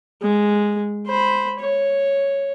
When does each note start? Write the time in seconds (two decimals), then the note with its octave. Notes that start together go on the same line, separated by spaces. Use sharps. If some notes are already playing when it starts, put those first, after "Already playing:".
0.22 G#3
1.07 C5 B5
1.59 C#5